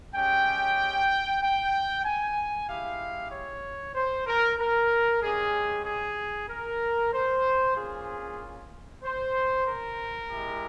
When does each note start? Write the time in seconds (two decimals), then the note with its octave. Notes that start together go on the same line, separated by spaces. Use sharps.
0.15 G#3 C#4 G4 G5
1.42 G5
2.05 G#5
2.69 G#3 E4 G4 F5
3.32 C#5
3.95 C5
4.27 A#4
4.59 A#4
5.22 G#3 C#4 G4 G#4
5.86 G#4
6.49 A#4
7.13 C5
7.76 A#3 C#4 F4 G#4
9.04 C5
9.67 A#4
10.30 G#3 E4 G4